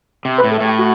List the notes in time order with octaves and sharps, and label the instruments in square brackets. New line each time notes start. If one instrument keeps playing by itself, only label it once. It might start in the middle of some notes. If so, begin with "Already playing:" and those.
[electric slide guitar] C3
[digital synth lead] B4
[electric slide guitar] A2
[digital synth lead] A4
[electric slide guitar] A2 [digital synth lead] G4
[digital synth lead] F#4